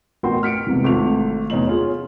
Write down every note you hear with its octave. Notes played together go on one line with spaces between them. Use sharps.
A1 B2 F#4 A#4 G5 C6
F6 B6 C#7 D7
E1 C2 C3 E3
G#1 A3 F4 F7
E2 C#4 D#4 F#7
C#4 F4 G#4